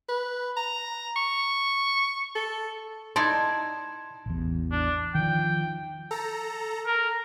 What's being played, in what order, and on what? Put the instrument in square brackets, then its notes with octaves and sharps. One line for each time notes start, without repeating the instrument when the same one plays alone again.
[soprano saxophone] B4
A#5
C#6
A4
[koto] D#4 E4 D5 [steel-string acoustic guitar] A5 [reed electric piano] C6 G#6
[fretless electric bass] A1 E2
[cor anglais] D4
[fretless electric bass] D#3 F3 [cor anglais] G5
[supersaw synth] A4 A#5
[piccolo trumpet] A#4